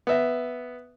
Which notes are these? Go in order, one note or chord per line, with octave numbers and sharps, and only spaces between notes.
B3 E5